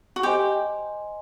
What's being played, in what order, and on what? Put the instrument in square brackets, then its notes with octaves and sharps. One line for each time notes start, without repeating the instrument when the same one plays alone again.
[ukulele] F#4
[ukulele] G4 [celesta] C5 D#5 G#5 C6